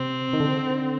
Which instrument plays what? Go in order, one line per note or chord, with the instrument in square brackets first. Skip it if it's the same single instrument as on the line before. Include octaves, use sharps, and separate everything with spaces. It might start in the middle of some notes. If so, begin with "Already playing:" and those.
Already playing: [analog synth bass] C3 [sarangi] C4
[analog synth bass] D#3
D3